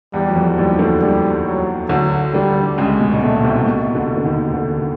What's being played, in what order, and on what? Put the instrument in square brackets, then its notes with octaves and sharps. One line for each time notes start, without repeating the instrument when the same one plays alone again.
[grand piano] E2 E3 [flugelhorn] G3
[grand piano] F#3
F2 F3
[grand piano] D#2 D#3 [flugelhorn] G3
[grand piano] D2 D3
[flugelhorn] G3
F#3
[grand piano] D2 D3 [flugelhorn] F#3
[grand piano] D2 D3 [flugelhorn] G3
[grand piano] C#2 C#3 [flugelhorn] G#3
[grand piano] B2
A#2
[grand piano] B2 [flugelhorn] A3
[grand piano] C2 C3
B2
D2 D3
D3
D#2 D#3
D2 D3